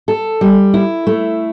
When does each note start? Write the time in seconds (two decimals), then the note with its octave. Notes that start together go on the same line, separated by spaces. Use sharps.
0.08 A4
0.41 G3
0.74 E4
1.07 A3